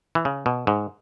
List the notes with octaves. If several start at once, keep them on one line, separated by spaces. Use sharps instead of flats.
E3
C#3
B2
G#2